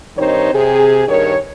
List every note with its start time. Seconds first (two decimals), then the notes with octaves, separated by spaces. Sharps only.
0.17 G2 D#3 C4 D#4 C5 C#5
0.53 C3 G#4
1.08 G2 D#3 A#4 C#5